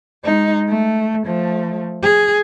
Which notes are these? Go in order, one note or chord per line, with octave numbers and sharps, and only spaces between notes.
G#3 D#4
A3
F3 A3
G#4